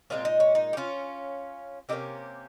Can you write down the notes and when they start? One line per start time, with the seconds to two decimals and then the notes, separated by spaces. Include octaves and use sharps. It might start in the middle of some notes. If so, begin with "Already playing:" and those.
0.10 A#2 G#3 C4 C#4 F4
0.25 D#4
0.40 C#4
0.55 D#4
0.73 G4
0.77 C#4 F4
1.89 C3 G3 A#3 C#4 D#4 G4